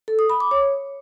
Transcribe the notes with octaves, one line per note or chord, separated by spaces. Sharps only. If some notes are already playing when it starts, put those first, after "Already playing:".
A4
D#6
B5
D6
C#5